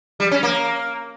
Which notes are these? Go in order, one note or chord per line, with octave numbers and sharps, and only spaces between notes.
G3
C#4
A#3